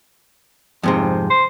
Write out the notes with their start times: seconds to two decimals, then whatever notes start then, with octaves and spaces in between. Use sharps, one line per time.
0.83 F2 G#2 C3
1.30 C5